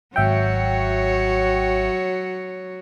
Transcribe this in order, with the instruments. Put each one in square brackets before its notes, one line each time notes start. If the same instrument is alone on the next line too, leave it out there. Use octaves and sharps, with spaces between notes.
[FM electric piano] G#1 E5 G5 [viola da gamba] F#3 F#4 C#5